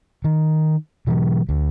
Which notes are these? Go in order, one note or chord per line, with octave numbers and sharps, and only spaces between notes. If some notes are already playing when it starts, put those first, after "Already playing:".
D#3
B2 E3 F#3
D2